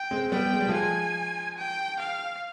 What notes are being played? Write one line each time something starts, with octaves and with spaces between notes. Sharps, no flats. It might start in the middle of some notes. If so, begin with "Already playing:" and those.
Already playing: G5
G#3 C4
G3 B3 G5
G#3
G3
F3 G#3
G#5
G5
F5